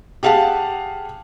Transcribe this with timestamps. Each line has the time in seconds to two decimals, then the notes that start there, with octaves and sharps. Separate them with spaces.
0.23 G4 G#4 F5 F#5 A5